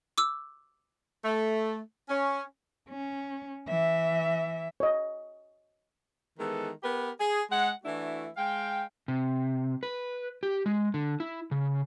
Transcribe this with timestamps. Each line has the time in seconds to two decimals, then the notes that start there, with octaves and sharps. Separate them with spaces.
0.18 D6 E6
1.23 A3
2.10 C#4
2.89 C#4
3.68 E3 E5
4.80 C#5 D#5
6.38 D#3 E3 G#3 B3 A4
6.83 B3 G4 A#4 B4
7.19 G#4
7.50 G#3 F#5
7.84 E3 A3 D4 E4 F#4
8.36 G#3 F5 G5
9.08 C3
9.83 B4
10.43 G4
10.66 G#3
10.94 D3
11.20 E4
11.51 C#3